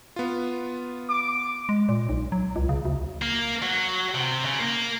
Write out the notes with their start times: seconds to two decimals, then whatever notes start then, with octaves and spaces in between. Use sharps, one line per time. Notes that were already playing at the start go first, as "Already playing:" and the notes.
0.16 B3 F4
1.09 D6
1.69 G#3
1.89 A#2
2.09 B1
2.32 F#3
2.56 C#2
2.69 C#3
2.85 D2
3.22 A#3
3.62 F#3
4.15 C3
4.45 C#3
4.60 A#3